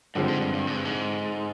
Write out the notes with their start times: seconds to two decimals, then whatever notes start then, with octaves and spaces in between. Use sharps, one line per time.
0.15 G2 D3 F3 G#3 C4
0.28 G#2
0.41 G2
0.53 G2
0.67 G#2
0.76 G2
0.85 G#2